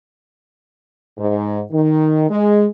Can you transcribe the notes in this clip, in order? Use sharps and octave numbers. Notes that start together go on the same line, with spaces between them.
G#2
D#3
G#3